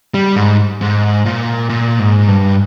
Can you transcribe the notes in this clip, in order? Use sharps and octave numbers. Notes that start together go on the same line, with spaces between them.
G3
G#2
G#2
A#2
A#2
G#2
G2